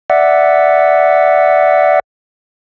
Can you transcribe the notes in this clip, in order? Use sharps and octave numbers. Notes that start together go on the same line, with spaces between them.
D5 E5 F#5